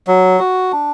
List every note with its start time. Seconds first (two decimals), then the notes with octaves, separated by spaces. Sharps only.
0.07 F#3
0.39 F#4
0.72 D4